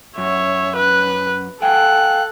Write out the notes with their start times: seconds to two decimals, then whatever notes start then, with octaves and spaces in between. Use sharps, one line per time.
0.18 F#2 C#5 E5
0.77 B4 F#6
1.62 A4 F5 G5 G#5 F#6